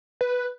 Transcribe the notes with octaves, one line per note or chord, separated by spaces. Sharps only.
B4